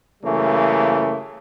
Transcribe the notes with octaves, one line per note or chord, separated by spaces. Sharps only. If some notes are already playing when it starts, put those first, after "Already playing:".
F#2 C#3 E3 G3 A3 A#3